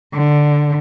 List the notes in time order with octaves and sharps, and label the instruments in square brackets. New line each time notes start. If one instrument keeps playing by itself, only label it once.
[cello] D3